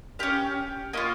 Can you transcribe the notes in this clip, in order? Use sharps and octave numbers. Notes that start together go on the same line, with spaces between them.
C#4 G4 F5
A#3 C#4 F4 D#5